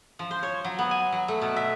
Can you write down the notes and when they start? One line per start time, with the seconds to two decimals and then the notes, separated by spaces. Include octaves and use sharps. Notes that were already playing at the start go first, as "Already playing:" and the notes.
0.19 F3
0.31 C5
0.43 C#5
0.65 F#3
0.79 B3
0.91 G#5
1.12 F#3
1.28 A3
1.42 B2
1.56 E5